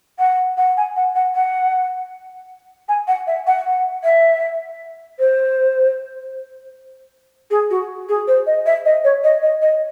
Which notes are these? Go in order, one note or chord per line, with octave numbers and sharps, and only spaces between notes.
F#5
F#5
G#5
F#5
F#5
F#5
G#5
F#5
E5
F#5
F#5
E5
C5
G#4
F#4
G#4
C5
D#5
E5
D#5
C#5
D#5
D#5
D#5